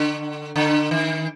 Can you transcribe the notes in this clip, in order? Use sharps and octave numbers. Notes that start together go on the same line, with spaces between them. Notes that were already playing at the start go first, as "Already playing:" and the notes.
Already playing: D3
D3
D#3